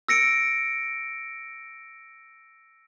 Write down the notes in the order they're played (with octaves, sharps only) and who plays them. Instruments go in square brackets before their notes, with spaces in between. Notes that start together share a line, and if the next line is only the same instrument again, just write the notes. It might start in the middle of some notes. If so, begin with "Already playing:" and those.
[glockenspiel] E6 A#6 C#7 D7